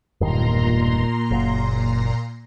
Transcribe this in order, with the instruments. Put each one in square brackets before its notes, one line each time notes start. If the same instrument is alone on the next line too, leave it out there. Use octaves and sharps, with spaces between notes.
[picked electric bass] E1 G2 D#3 [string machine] A#2 A#5 C6
[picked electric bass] F#1